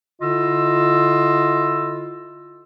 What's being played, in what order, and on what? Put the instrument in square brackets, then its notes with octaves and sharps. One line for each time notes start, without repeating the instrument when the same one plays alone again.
[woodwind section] D3 E4 F4 D#5 E6